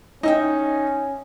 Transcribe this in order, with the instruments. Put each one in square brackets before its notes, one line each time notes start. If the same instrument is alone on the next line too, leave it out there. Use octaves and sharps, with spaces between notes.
[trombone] C#4 [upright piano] D#4 [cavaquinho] D#5 E5 G5